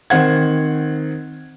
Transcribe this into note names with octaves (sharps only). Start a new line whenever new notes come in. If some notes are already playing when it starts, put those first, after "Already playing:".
D#3 C4 C5 F#5 G#6